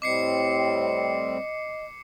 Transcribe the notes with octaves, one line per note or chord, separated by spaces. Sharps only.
A2 G3 C4 D#5 D6 C7 C#7